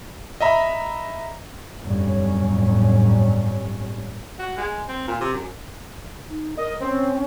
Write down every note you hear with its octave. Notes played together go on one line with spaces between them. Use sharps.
D#5 E5 A#5 B5
G1 F2 A2 F#3 G3 C#4
F#4
G#3
C4
A#2
C3
F#2
D#4
A#4 D#5
C4 C#4